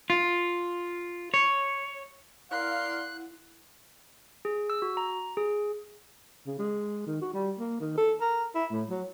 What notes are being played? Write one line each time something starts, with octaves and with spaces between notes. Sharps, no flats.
F4
C#5
E4 A#4 D5 F5 F#5 C6 F#6
G#4
E6
F#4
A#5
G#4
C#3
G#3
D#3
F#4
G3
A#3
D#3
A4
A#4
E4
A2
F#3